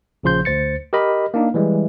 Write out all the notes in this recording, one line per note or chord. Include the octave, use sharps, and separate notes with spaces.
A#1 C#3 F3 C6 G6
D2 C5 A6 C#7
G4 A#4 D#5 B5
A#3 D4 D#4
E3 G3 G#3